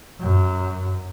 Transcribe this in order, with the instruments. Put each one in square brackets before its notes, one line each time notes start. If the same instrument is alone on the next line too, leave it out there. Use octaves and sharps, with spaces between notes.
[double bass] F#2